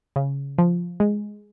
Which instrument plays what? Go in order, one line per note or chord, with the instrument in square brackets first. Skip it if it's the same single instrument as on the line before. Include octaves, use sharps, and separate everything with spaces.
[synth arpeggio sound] C#3
F3
G#3